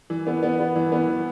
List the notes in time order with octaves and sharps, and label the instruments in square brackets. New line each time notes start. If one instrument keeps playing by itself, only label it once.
[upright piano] E3
B3
B3
B3
E3
B3
E3